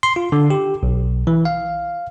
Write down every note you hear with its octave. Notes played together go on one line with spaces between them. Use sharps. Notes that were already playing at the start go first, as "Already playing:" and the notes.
C6
F4
D3
G4
B1
E3
F5